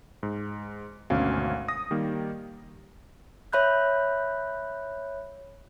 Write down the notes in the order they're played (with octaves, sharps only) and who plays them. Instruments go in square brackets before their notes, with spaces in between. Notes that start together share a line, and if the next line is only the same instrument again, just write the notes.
[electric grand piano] G#2
G#1 D2 B2 C#4 F#4 F5
D#6 A#6
D#3 G3 A#3
[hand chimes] C#5 E5 B5 F#6 G6